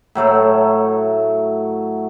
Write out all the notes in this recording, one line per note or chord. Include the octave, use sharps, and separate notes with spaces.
A2 F#3 A3 A4